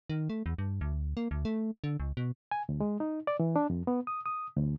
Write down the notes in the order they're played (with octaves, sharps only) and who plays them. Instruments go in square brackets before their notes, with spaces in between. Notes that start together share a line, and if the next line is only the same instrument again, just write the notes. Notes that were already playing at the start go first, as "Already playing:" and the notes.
[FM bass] D#3
A3
E2
G2
D2
A#3
D2
A3
D3
C#2
B2
[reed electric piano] G#5
D2
G#3
D#4
D5
E3
D4
F2
B3
D#6
D#6
D2